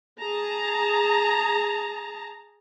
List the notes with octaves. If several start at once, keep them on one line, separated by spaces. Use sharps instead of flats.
G#4 A5 A#5